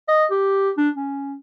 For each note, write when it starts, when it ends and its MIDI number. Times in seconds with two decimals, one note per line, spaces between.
0.08 0.25 75
0.31 0.71 67
0.78 0.89 62
0.96 1.35 61